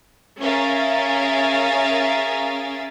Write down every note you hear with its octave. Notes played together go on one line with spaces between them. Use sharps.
C#4 G#4 A#4 E5 F5 A6